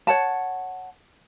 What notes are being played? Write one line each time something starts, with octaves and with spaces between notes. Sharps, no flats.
C#5 F#5 A5